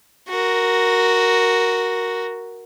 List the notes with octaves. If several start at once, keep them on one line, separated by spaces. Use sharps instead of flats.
F#4 A#4